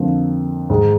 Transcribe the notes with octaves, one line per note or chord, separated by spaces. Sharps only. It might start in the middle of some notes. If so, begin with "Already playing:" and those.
Already playing: F2 D3 F3 A#3
G#2 D#3 G#3